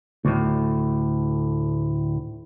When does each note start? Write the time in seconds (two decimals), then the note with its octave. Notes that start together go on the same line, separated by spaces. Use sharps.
0.25 D2 A2